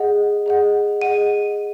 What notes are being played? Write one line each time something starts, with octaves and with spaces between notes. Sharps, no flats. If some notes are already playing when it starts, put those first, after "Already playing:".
Already playing: G#4 D#5 F#5
G#4 D#5 F#5
G#4 D#5 F#5 D#7